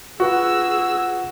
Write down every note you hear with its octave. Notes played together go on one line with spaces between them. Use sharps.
F4 F#4 G#4 B4 F#5 E6